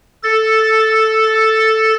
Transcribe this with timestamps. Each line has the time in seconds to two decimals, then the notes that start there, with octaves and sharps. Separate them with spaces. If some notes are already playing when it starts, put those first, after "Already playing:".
0.23 A4 A6